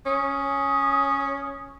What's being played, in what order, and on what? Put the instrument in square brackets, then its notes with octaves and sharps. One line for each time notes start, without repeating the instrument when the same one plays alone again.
[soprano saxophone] C#4 [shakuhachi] D#6